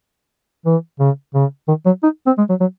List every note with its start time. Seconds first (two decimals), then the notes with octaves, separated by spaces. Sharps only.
0.66 E3
1.00 C#3
1.34 C#3
1.68 D#3
1.86 F#3
2.03 D#4
2.26 C4
2.38 G#3
2.49 F#3
2.60 F#3